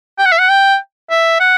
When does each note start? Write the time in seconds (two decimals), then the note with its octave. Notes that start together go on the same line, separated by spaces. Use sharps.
0.18 G5
0.25 F#5
0.32 E5
0.39 F#5
0.49 G5
1.10 E5
1.40 F#5